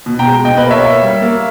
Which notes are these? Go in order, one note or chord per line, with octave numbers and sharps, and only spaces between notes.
B2
G5 A#5
G#3
B2 D#5 G5
B4 D#5
A#3
C#5 E5
A#3
G3
A#3